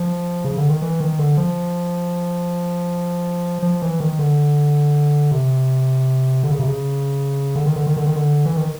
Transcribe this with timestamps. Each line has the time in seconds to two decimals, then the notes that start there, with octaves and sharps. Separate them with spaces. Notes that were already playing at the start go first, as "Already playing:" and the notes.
Already playing: F3
0.45 C#3
0.57 D3
0.69 D#3
0.82 E3
1.00 D#3
1.19 D3
1.37 F3
3.62 F3
3.82 E3
4.00 D#3
4.19 D3
5.31 C3
6.43 D3
6.51 C#3
6.60 C3
6.68 C#3
7.56 D3
7.66 D#3
7.76 D3
7.87 D#3
7.97 D3
8.06 D#3
8.16 D3
8.46 E3
8.57 D#3